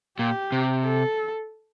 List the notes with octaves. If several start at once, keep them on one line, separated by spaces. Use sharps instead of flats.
A#2 G4
C3
A4